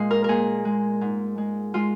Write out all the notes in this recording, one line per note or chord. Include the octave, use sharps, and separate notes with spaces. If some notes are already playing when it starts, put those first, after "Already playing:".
Already playing: A#2 G#3 D#5 F5
A#4
A#2 G#4 A#4
G#3
G#2
G#3
G#3 F4